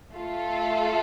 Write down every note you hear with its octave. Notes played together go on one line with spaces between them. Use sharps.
A3 F4 A4 F5